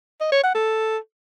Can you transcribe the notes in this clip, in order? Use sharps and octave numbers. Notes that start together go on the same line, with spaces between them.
D#5
C#5
F#5
A4